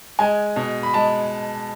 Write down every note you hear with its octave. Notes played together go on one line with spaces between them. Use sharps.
G#3 G#5
B2
B5
G#3 A5